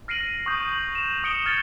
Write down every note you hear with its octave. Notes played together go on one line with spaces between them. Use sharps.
F6 A#6 C7 D7 D#7 F#7
C#6 D#6 G6
F#7
E7 F7
D#6 C#7 D7 G7
F6 G#6 A6 C#7 G7